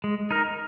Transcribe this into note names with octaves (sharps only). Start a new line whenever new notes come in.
G#3
D#4 A#4